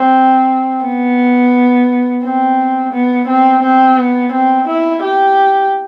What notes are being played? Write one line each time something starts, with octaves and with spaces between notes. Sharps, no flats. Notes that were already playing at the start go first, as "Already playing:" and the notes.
Already playing: C4
B3
C4
B3
C4
C4
B3
C4
E4
G4